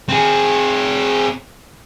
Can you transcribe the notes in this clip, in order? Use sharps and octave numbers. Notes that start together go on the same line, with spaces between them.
C4 G#4